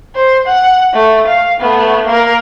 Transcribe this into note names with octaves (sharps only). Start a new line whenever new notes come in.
C5
F#5
A3
F5
A3 B3
A#3 A#4